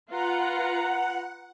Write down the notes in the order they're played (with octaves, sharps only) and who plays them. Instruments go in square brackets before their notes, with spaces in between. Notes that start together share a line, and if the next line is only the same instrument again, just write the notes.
[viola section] F4 B4 A#5 [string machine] F#5